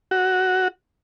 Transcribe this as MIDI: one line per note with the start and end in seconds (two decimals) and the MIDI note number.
0.11 0.68 66